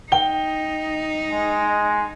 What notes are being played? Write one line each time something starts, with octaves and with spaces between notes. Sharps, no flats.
D#4 G5 G7
G#3